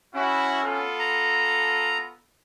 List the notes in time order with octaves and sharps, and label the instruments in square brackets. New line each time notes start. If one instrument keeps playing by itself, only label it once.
[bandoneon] C#4 [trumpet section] E4 F#4
[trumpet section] B3 F4 A4
[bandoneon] A#5